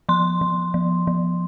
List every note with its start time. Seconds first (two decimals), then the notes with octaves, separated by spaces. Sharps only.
0.09 F3 C6
0.41 F3
0.74 F3
1.07 F3